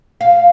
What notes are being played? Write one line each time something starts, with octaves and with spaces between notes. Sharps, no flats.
F5